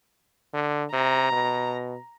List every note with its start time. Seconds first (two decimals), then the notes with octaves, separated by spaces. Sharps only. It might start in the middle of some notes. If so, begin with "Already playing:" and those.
0.54 D3
0.93 C3 A#5
1.32 B2